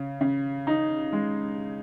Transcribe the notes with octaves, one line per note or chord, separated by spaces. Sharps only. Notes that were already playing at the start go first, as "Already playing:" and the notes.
Already playing: C#3
C#3
D#4
G#3